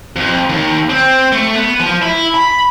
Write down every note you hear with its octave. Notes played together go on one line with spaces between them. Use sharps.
F2
D#2
C4
A3
B3
F3
E4
B5